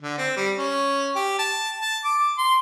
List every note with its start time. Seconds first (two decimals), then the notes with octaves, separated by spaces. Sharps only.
0.02 D3
0.18 C4
0.36 G3
0.57 C#4
1.15 G4
1.39 A5
1.80 A5
2.04 D6
2.38 C6